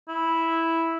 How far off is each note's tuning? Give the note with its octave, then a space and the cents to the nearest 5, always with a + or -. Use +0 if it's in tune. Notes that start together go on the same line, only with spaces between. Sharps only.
E4 -5